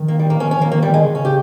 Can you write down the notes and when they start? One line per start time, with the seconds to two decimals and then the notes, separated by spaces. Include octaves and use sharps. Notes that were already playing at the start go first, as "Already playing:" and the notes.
Already playing: D#3
0.08 A#3
0.19 G3
0.30 A#3
0.40 D#3 C#4
0.51 C#4
0.57 D#3 A#3
0.72 D#3 A#3
0.82 G3
0.88 D#3
0.94 G#3
1.04 C#3
1.15 C#4
1.25 G4